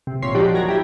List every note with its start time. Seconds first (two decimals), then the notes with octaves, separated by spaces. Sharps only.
0.07 C3
0.22 G#1 A#2 C#5 C6 B6 C7
0.35 F3 D4 D#4 F#4 G4
0.54 D#2 F#3 A#4 G#6 A#6
0.68 E4 G4